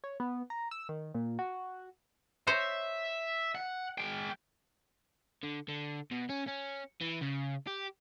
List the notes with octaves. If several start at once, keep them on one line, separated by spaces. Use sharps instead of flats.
C#5
B3
A#5
E6
D#3
A#2
F#4
C5 C#5 D#5 E5
F#5
G#3 G5
D3
D3
B2
C#4
C#4
E3
C#3
G4